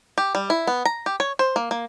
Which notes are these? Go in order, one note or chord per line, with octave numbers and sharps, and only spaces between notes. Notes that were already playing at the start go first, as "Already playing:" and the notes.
G4
G3
E4
B3
A#5
G4
C#5
C5
A#3
A#3